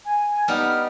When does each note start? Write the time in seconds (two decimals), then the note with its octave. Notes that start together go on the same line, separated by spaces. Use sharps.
0.05 G#5
0.48 G3 B3 D#4 F6